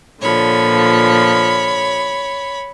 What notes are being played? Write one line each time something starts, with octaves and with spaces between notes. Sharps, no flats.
A#2 D3 F3 C#5 B5